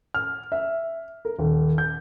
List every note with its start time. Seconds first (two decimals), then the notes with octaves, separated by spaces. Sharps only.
0.14 F6
0.52 E5
1.25 A#4
1.38 D#1
1.78 G6